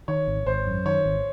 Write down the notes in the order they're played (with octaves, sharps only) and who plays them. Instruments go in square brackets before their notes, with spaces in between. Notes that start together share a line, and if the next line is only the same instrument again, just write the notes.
[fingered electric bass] D#3 [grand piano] C#5
[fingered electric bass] G#1
[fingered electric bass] G#1 [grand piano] C5
[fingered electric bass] F#2
[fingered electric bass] D#3 [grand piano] C#5
[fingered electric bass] G#1